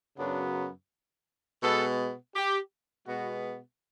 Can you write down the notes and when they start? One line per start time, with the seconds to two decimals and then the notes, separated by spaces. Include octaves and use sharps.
0.18 F#2 C#3 F#3 B3 D4
1.62 B2 G#3 B3 A4
2.35 G4
3.06 B2 G#3 B3 F#4